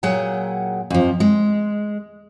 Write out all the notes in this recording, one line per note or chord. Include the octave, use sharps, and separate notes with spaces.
A#2 F#3 G#4 F#5 G5
F2 F3
G#3